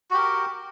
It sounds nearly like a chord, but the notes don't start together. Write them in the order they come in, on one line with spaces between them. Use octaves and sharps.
F#4 G4 A#4